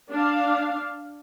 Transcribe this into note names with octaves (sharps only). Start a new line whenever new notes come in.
D4 F5